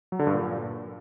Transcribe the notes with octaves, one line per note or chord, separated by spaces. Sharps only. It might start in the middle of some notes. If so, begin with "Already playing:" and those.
F#3
D3
G2
A#2